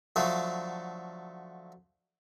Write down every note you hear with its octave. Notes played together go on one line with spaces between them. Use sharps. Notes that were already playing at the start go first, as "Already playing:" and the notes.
D3 F3 F#3 A3